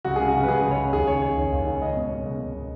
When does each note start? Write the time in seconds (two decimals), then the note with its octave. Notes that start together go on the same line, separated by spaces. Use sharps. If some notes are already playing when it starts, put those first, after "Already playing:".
0.05 C#2 F#4
0.16 C#3 G#4
0.28 F#4
0.34 C#3
0.43 B4
0.48 C#2 G#4
0.63 C#2
0.71 C#5
0.78 C#3
0.93 D#2 G#4
1.07 C#3 C#5
1.22 C#3 C#5
1.37 D#2
1.52 D#2
1.67 C#3
1.81 C#2 D#5
1.96 B2
2.04 C#5
2.11 B2
2.26 C#2
2.40 C#2
2.55 B2